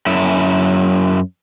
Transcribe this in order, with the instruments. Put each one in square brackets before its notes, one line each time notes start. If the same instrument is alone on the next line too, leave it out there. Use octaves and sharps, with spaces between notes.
[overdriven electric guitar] F#2 E4